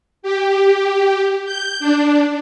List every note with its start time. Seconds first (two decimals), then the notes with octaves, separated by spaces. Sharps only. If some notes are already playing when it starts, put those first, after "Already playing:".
0.23 G4
1.45 G6
1.80 D4